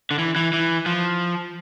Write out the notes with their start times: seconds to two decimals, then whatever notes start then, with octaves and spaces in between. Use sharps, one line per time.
0.11 D3
0.19 E3
0.36 E3
0.53 E3
0.86 F3